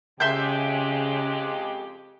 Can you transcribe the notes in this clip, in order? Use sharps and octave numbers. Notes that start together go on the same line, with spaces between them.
F2 C#3 G#3 G4 E5 C6 G6